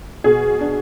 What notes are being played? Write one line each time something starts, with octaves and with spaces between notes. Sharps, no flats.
B2 G#4
D4